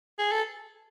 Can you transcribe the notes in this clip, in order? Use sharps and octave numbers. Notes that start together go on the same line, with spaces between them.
G#4
A4